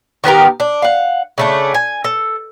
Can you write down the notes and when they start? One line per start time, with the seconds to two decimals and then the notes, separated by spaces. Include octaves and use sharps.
0.24 D#3 B3 G4 A#4
0.60 D4
0.82 F5 F#5
1.38 C#3 A3 D4
1.74 G#5
2.04 A4